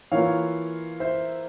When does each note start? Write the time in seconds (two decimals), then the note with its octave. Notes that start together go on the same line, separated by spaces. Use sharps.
0.11 E3 A#3 F4 C#5 F5
1.00 C5 E5